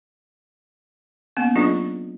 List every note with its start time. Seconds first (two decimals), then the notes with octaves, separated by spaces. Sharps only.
1.37 A#3 B3 C#4
1.55 F#3 D4 F4 G#4 B4 D#5